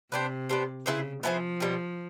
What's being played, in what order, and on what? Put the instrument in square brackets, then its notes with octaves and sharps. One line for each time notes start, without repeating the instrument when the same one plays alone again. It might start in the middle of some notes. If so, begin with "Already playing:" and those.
[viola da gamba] C3 [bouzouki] B3 D4 G4 C5
[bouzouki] B3 D4 G4 C5
[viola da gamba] C#3 [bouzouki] B3 E4 G#4 C5
[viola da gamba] F3 [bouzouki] B3 E4 G#4 C5
[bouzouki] B2 G3 C4